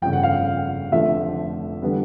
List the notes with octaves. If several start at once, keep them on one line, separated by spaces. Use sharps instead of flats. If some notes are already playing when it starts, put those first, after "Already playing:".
G1 F2 C#3 G5
F#5
F5
F#5
F1 F2 D3 F3 A3 E5
D3 G3 B3